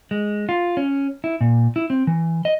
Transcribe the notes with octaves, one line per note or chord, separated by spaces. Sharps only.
G#3
F4
C#4
E4
A#2
E4
C4
E3
D#5